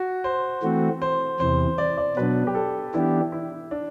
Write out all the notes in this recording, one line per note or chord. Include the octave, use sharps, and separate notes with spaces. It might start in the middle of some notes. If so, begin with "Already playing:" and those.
Already playing: F#4
C5
E3 A3 C4 F#4
C5
E2 C3 E3 C5
D5
D5
B2 F#3 B3 D4 B4
G4
A4
E3 B3 D4 E4 G4
E4
D4